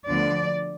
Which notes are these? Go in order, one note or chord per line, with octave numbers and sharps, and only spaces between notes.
D2 D3 F3 B3 D5